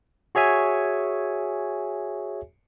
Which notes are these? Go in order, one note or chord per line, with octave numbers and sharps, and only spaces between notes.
F#4 G#4 C#5 E5 G#5